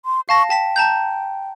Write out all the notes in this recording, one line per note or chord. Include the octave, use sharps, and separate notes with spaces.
C6
F5 A5 C#6 A#6
G5 A5 B6 E7
A5 A#5 G6